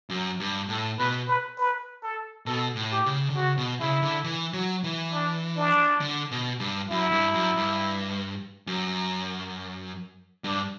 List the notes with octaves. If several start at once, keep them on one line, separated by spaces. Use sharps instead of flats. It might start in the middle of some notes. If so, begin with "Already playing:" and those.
F#2
G2
A2 A4
B2 B4
B4
B4
A4
B2 A4
A2
G4
C#3
D3
C#3 F#4
B2
C#3 E4
D3
E3
F#3
E3
D4
D4
D3
B2
G2
F#2 E4
G2
F#2
G2
F#2
G2 D4